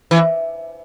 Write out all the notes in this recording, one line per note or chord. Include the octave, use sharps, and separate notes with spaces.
E3